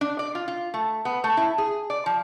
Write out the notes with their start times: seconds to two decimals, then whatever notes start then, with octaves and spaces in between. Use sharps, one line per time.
0.01 D4
0.19 D5
0.35 F4
0.48 F4
0.74 A3
1.05 B3
1.24 A3
1.37 E4
1.58 G#4
1.90 D5
2.06 F3